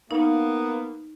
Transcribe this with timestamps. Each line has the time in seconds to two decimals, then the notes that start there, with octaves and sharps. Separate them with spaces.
0.11 A#3 B3 D#4